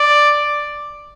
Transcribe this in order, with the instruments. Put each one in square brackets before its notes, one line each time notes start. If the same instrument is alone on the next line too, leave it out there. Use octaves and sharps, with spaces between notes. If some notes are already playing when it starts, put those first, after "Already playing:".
Already playing: [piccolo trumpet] D5